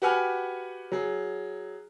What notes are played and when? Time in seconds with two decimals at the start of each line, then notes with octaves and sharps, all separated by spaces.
0.02 F#4 G4 B4 F#5 G#5 F6
0.92 F#3 G#4